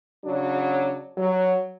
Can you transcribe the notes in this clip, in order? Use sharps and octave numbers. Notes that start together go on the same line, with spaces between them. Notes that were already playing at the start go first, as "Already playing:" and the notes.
C#3 F#3 D4 F#4
F#3